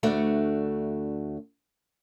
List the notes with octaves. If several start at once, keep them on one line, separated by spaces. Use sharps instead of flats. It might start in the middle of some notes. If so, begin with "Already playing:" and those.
D2 A3 D4 F#4